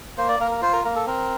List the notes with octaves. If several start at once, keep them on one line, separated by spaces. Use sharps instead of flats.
A#3 C5
D5
A#3 A#4
A#4
F4 C5
A#4
A#3 A#4
A4
C4 A#4